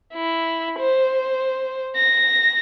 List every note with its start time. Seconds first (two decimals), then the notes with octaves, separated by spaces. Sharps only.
0.14 E4
0.80 C5
1.97 A#6